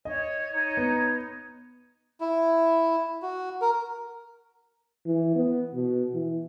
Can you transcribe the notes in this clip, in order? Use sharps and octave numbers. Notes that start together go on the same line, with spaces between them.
C#5 D#5
D#4 C#5
B3
E4
F#4
A#4
E3
B3
B2
E3